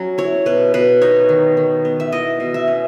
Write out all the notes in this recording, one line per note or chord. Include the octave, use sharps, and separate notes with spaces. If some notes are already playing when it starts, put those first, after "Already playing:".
Already playing: F#3 C#4
E4 C#5
B2 B4
B2 B4
D#4 C#5
D#3
D#3
B3
E5
E4 D#5
B2
E5
C#4